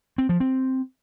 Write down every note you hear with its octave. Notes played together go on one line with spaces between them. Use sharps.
C4
F3
C4